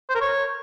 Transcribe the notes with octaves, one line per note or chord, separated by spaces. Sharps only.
C5
A#4
C#5